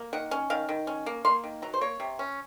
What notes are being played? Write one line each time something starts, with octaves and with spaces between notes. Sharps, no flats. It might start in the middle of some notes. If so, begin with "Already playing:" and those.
Already playing: A#3
D#3 F#5
C#4
D#3 F5
D#3
C#4
A#3
A#3 C6
D#3
F#3 A#5
C5
A#3 C#5
C3
C#4